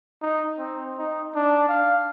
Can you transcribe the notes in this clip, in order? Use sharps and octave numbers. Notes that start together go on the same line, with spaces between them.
D#4
C4
D#4
D4
F5